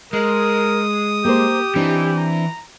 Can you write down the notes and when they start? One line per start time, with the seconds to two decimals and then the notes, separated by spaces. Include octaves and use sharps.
0.13 G#3 A#4 D#6
1.25 A#3 G4 C5
1.75 E3 C4 D4 D#4
2.18 A#5